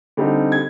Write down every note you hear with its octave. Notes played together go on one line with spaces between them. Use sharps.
D3 G3 C4 D#4
G#6